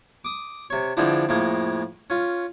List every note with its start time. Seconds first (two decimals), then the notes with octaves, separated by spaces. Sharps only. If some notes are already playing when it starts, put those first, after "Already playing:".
0.25 D6 D#6
0.70 C3 C#5
0.97 D3 E3 F3 G#3 C4 D4
1.29 F2 A2 G#3 A#3
2.10 C#4 F4